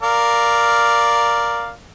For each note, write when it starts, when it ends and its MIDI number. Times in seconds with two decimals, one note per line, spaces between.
0.03 1.71 70
0.03 1.71 74
0.03 1.71 77